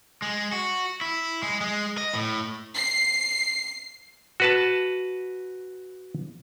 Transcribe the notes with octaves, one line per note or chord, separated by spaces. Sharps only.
G#3
F#4
E4
G#3
G#3
D#5
A2
C7
F#4 B4 A5